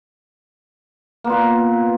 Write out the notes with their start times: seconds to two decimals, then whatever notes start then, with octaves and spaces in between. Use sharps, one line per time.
1.24 A#3
1.27 B3
1.30 F4
1.32 B4